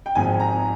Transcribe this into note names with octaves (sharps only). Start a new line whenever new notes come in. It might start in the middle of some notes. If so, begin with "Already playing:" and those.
G5
G#1 G#2 F3 G#5
A#5